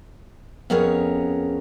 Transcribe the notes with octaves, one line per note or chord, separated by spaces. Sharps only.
F2 B3 C#4 G#4 A#4 C#5